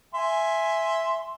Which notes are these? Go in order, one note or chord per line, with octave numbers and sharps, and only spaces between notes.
E5 G#5 C6